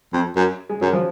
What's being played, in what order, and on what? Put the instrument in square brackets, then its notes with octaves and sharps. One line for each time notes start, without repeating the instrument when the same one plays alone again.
[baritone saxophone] F2
F#2
[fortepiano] G#3
[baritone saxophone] F#2 [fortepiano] F#3
[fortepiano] F3